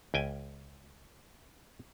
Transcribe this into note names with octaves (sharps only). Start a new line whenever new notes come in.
C#2 G5 G#5